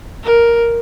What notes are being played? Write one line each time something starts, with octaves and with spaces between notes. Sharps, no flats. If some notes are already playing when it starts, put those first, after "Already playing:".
A#4